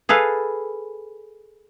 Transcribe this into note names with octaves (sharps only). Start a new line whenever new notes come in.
G#4 A4 B4 F5